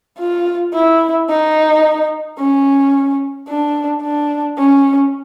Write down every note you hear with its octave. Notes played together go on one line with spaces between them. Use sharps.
F4
E4
D#4
C#4
D4
D4
C#4